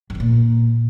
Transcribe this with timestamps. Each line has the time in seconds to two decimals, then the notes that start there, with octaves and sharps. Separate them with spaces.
0.10 F#2
0.15 E2
0.20 A#2